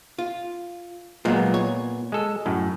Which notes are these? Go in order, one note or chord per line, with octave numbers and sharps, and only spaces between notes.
F4
A#2 F#3 G#3 B3 F4
C#5
G#3 A4
F#2 A2